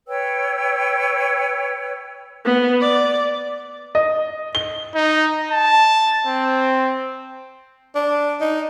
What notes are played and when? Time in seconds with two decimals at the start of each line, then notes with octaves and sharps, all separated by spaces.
0.07 B4 C#5 G5 E6
2.45 B3
2.81 D5
3.95 D#5
4.55 G7
4.95 D#4
5.51 A5
6.27 C4
7.95 D4
8.41 D#4